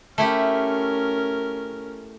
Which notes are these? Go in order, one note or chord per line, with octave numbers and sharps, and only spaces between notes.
A3 C#4 E4 G4 A#4